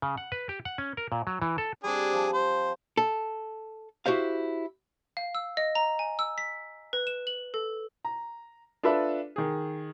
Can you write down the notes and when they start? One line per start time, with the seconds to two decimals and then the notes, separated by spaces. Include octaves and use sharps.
0.02 C#3
0.17 F#5
0.32 B4
0.49 G4
0.65 F#5
0.78 C#4
0.97 A#4
1.12 A#2
1.27 F#3
1.42 E3
1.58 A4
1.84 G3 C4 D4 G#4
2.12 F3
2.33 C5
2.97 A4
4.06 E4 F#4 G4 C5 F5
5.17 F5
5.35 E6
5.57 D#5
5.75 A#5
5.99 G#5
6.19 E6
6.38 B6
6.93 B4
7.07 E7
7.27 F#7
7.54 A4
8.05 A#5
8.83 D4 F4 A4 B4 E5
9.36 D#3 G#4